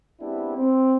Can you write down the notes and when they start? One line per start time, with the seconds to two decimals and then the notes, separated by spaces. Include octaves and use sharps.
0.21 G#3 B3 C4 D4 E4 G4
0.57 C4